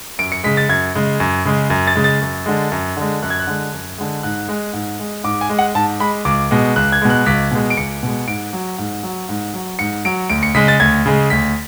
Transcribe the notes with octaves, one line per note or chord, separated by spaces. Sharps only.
F#2 D7
C#7
C#3 G#3 B6
A6
F#2 G#6
C#3 G#3
F#2
C#3 G#3
F#2
A6
C#3 G#3
A6
F#2
D3 G#3
F#2
D3 G#3
F#2 F#6
G#6
F#6
D3 G#3
F#2
D3 G#3
G#2 F#6
G#3
G#2
G#3
G#2 D6
G#5
G#3
F#5
G#2 A5
G#3 B5
C#2 D6
B2 G#3
C#2 F#6
G#6
B2 G#3
F#6
C#2 B6
B2 G#3
D7
C#2 C#7
B2 G#3
G#2 D7
F#3
G#2
F#3
G#2
F#3
G#2 C#7
F#3 D7
D2 D7
C#7
C#3 G#3 B6
A6
D2 G#6
C#3 G#3
D2 B6